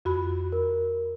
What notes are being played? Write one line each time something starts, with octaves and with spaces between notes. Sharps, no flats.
F2 F#4 B5
A#4